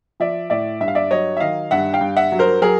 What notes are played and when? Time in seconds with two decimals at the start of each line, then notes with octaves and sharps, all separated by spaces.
0.20 F3 D5 E5
0.50 A2 D5 E5
0.80 G2 E5
0.88 F5
0.95 D5 E5
1.11 F#3 C#5 D#5
1.37 E5
1.40 D#3 D#5 F5
1.71 G2 E5 F#5
1.93 F5 G5
2.01 G2
2.17 E5 F#5
2.32 F#3
2.39 A#4 C5
2.62 F#3 G#4 A#4